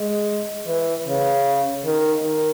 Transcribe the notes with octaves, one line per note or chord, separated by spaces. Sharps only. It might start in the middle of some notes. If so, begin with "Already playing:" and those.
Already playing: G#3
E3
C#3
D#3
D#3